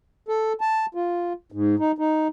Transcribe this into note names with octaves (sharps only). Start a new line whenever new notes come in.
A4
A5
F4
G#2
D#4
D#4